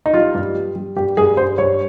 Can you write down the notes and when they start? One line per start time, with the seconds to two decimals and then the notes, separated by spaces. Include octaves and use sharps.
0.06 D#4
0.14 G3 F4
0.35 G2
0.55 G3
0.76 G3
0.97 G2 G4
1.17 G2 G#4
1.37 G2 C5
1.58 G2 C#5